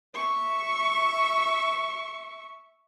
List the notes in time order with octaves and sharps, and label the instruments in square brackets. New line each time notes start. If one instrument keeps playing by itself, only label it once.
[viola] E5 C#6